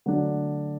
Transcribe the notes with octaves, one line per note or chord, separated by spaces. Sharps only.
D3 F#3 A3 D4